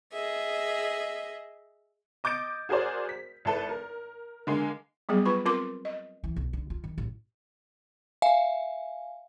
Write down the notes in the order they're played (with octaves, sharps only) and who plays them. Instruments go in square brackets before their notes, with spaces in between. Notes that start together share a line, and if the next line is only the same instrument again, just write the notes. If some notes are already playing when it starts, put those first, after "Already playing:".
[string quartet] G#4 D#5 E5
[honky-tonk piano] D#5 D6 G6 A6 D7
F#4 G#4 A#4 C5 D5
B6
G#1 E4 A4 B4
A#4
D3 G#3 A#3
[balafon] F#3 G3 B3 G#4
F4 B4 B5 C#6
C4 F4 A#4 C6 D6
D#5
[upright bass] E3
B1
D3
F4
D#3
A1
[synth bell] E5 F5 G#5